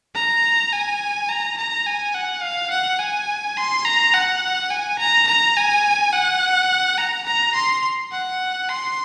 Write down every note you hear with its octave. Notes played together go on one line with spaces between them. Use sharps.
A#5
G#5
A#5
A#5
G#5
F#5
F5
F#5
G#5
C6
A#5
F#5
G#5
A#5
A#5
G#5
F#5
A#5
A#5
C6
F#5
C6